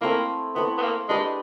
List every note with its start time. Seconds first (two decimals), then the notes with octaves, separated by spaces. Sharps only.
0.01 A3 A#3 C4 E4
0.55 A3 B3 C4 E4
0.78 B3
0.82 A#3
1.09 G#3 D4 G4 B4 D#5